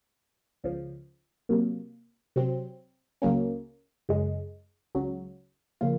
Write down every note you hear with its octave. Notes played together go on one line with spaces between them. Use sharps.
C#2 C#3 F3
C3 F#3 A#3
C3 F#3 C4
C#2 C#3 F#3 A#3 C#4
F#2 C#3 G#3
C#2 C#3 F#3
C#3 F3 A#3 F4